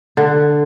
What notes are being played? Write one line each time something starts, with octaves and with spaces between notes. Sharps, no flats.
D3